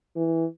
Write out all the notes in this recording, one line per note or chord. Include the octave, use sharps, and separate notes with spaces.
E3